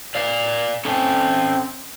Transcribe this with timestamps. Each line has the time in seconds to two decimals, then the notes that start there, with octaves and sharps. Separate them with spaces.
0.15 D5 F5
0.85 C4 C#4 A4